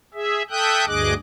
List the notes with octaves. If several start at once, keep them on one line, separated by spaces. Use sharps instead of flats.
G#4 E5
A4 E5 G5 D#6 F#6 G6
D2 G2 G#4 D#5 D6 F#6